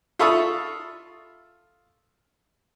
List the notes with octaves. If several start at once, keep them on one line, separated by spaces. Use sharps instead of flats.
F4 A4 E5 B5 C#6 D#6